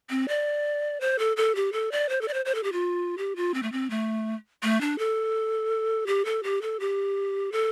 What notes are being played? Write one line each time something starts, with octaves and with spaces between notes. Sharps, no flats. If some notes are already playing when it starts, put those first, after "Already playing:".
C4
D5
C5
A4
A4
G4
A4
D5
C5
A4
D5
C5
C5
A4
G4
F4
G4
F4
C4
A3
C4
A3
A3
D4
A4
G4
A4
G4
A4
G4
A4